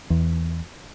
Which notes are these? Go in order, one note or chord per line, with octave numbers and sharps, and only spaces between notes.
E2